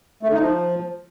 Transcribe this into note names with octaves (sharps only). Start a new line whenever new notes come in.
A3
D3
D#4
F3